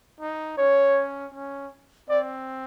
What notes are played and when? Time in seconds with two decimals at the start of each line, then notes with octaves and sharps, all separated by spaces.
0.20 D#4
0.58 C#4 C#5
1.34 C#4
2.09 C4 D5